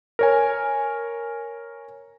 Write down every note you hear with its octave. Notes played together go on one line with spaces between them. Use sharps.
A#4 C#5 G#5